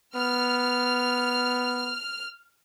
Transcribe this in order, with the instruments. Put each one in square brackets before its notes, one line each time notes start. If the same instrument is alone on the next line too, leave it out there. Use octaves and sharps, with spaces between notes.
[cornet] B3 [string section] F6